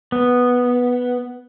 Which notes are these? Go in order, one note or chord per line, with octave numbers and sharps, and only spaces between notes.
B3